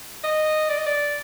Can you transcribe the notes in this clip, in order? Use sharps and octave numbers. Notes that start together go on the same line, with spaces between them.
D#5
D5
D#5
D5